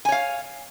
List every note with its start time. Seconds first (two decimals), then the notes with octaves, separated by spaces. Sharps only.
0.05 G#5
0.09 C#5
0.12 F5